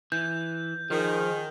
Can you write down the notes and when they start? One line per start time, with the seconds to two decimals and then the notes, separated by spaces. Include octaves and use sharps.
0.12 E3 G6
0.90 D#3 F3 G#4